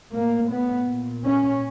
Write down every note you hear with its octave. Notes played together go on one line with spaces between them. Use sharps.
A2 A#3
B3
A#2
C#4